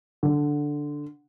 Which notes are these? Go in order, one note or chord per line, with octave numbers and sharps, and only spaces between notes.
D3